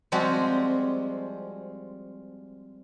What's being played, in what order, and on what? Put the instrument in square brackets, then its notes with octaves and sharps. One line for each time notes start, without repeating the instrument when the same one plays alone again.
[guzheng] F3 G3 G#3 C4 F#4